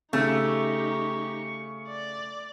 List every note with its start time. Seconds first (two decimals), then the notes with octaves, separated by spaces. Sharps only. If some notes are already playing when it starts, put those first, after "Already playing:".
0.13 C#3 A3 D#4 G4 C#6
1.88 D5